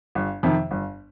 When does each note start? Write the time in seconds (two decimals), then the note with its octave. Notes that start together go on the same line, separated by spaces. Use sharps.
0.15 G1
0.43 F2 C3 D#3
0.71 G1